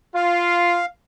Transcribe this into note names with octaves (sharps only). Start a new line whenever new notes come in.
F4 F5